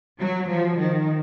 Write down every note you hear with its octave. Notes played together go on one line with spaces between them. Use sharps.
F#3
F3
D#3